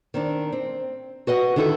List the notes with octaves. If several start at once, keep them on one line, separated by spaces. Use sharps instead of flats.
D#3 C4 D4
C4
F#4 B4 D#5 F#5
D3 D#3 D#4 E4 A4